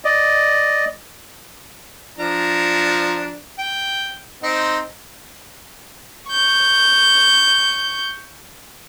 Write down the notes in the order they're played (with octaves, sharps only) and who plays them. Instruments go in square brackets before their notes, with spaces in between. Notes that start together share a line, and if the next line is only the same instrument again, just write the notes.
[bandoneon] D5 D#5
[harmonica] F3 D4 A#5
G5
C4 D#4
[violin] C#6 G6